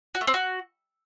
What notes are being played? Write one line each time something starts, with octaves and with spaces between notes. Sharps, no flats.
F#4
A3
C4
F#4